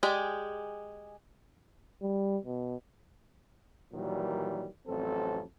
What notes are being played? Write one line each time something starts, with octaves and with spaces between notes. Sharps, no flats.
G#3 G4 G#4 D5
G3
B2
A#2 D#3 E3 F#3 G3
A1 F2 F#3 C4 A4